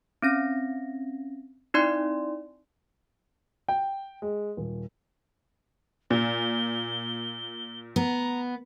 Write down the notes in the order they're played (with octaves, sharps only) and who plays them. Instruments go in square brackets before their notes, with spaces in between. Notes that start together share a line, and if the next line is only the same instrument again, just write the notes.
[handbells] C4 C#4 A#6
C4 D#4 E4 D5 C6
[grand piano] G5
G#3
D#1
[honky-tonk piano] A#2 [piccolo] G7
[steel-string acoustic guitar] B3 [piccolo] A#5